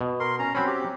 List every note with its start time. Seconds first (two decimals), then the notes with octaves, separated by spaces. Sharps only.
0.01 B2
0.20 A#4 C6
0.39 C#4 A#5
0.55 F#3 C4 C#4 B5
0.67 G4